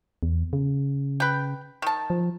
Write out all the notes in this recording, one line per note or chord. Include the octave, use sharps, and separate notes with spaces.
E2
C#3
B4 G5
D#3 A5
F3